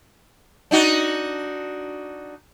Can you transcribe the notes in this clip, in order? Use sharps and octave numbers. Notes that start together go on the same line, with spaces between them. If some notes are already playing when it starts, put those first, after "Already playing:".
D4 D#4 F#4